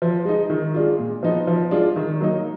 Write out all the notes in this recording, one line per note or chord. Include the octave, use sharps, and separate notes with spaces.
F3
G#3 D#4
D#3
G#3 D4 F4
A#2
F3 B3 D#4
F3
G#3 D4 F4
D#3
F#3 A#3 D#4